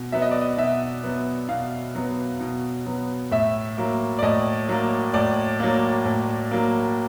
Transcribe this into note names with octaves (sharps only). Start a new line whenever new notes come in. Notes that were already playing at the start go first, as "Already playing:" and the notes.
Already playing: B2
F#3 B3 E5
D#5
D5
D#5
B2 E5
F#3 B3
B2 F5
F#3 B3
B2
F#3 B3
A2 E5
F#3 A#3
D5
A2 D#5
F#3 A#3
A2 D5
F#3 A#3
A2
F#3 A#3